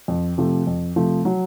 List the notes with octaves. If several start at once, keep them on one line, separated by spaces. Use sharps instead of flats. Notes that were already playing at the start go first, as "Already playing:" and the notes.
F2
C3 F3 A3
F2
C3 F3 A3
F#3